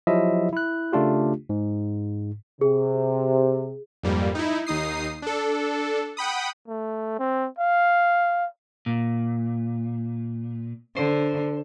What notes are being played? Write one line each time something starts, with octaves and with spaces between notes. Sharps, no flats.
F3 F#3 E4 G4 D#5 E5
E4 F#6
C#3 A3 D4 F4 G4
G#2
C3 G#4
F2 G#2 G3 A#3
D#4 E4
D#2 D#4 D#6 C7
D4 A4
F#5 G5 B5 D#6
A3
C4
F5
A#2
D3 C5